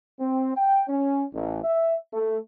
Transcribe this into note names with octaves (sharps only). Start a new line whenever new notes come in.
C4
G5
C#4
A1
E5
A3